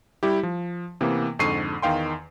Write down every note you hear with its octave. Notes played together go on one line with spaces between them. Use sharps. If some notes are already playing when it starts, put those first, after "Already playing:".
G3 E4 G4
F3
C3 E3 A#3 B3
F2 G#2 D3 C#6 C7 D#7
E2 D#3 F5 G5 C6